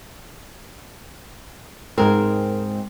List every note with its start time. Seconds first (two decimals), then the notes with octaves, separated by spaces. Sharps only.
1.98 G#2 G#3 C4 A#4